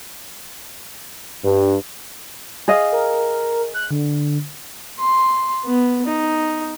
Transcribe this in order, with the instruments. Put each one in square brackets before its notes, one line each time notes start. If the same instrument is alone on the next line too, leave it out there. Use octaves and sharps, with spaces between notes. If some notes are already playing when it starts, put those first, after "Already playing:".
[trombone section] G2
[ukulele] G#4 D#5 F5
[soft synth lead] A#4
F#6
D3
[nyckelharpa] C6
B3
D#4